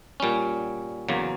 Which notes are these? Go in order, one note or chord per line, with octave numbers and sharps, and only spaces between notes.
A#2 G3 C#4
E2 C#3 F#3 A#3